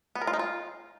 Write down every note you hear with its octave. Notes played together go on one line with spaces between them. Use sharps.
B3
A#4
F4
D#4
F4